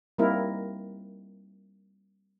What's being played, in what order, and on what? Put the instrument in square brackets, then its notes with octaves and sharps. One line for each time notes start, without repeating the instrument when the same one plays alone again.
[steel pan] G3 A#3 C4 D#4 E4 A#4